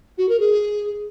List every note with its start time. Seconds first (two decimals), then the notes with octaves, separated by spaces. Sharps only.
0.18 F#4
0.29 A#4
0.40 G#4